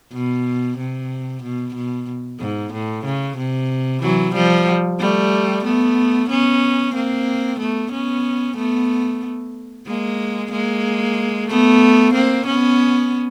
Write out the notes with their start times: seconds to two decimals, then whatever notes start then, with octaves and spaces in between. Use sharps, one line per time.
0.13 B2
0.78 C3
1.43 B2
1.75 B2
2.40 G#2
2.73 A2
3.05 C#3
3.38 C3
4.02 E3 F#3
4.35 F3 G3
5.00 G3 A3
5.64 A3 B3
6.29 B3 C#4
6.95 A#3 C4
7.59 A3 B3
7.92 B3 C#4
8.57 A3 B3
9.87 G#3 A#3
10.52 G#3 A#3
11.49 A3 B3
12.14 A#3 C4
12.46 B3 C#4